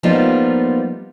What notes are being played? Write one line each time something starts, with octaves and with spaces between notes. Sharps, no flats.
F3 G3 A#3 B3 D#4 F4